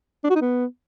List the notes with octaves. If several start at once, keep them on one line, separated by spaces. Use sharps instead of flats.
D4
F#4
D#4
B3